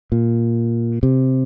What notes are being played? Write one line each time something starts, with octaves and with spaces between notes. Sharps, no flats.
A#2
C3